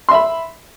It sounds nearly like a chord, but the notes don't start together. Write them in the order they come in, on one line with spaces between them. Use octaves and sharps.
C6 E5 B5